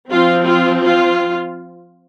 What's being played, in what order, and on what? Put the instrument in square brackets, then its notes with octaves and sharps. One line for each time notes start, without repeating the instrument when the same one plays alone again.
[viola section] F3 C4 F4
F4
F4